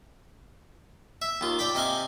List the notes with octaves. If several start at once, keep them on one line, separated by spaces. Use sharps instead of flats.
E5
D#2 F4
D5 G5 B5
C3 D#5 F5 G#5